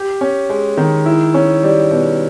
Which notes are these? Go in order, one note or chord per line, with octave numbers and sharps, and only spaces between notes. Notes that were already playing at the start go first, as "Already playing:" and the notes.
Already playing: G4
C#4
G#3
D#3
E4
C#4
G3
B2